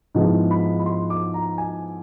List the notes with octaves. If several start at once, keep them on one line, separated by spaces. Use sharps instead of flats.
G#2 F3 G#3 B3 E4
B5
B5
C6
D6
A#5
G#5